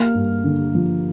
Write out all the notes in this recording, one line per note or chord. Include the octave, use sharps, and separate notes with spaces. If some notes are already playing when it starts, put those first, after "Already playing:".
Already playing: A#3 F6
G2
D3
F3